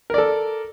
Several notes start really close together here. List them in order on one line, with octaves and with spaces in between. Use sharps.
A#4 D5 A4